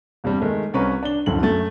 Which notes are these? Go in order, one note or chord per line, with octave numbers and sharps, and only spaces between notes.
E2 G2 C3 G3
D#3 G#3 A3
C2 C#4 B4 A#5 C#6
D4 G7
D1 F#2 D3 F#7
F#2 A3 A6